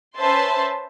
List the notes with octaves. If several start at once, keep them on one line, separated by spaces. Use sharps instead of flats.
C#4 B4 C5 E5 A5 C6